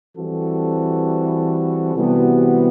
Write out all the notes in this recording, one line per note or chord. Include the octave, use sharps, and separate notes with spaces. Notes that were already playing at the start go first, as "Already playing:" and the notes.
E3 G3 C4 F#4 A4
C3 E3 G3 B3 F#4